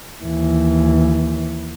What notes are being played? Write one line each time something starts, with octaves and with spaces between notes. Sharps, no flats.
D#2 E3